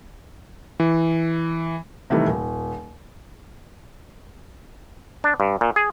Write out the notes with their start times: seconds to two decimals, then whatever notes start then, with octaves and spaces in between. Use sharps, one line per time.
0.80 E3
2.10 C3 D#3 E3 G3 A3
2.27 D#1
5.24 D4
5.40 G2
5.61 A#2
5.76 G#4